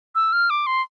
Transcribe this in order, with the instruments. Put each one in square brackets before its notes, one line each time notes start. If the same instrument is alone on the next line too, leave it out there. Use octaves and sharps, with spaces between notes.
[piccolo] E6
F6
D6
C6